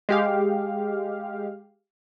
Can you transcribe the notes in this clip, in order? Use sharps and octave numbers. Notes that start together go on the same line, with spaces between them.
G#3 G4 F5